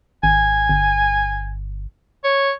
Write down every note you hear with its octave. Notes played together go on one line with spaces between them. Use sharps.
G#1 G#5
G1
C#5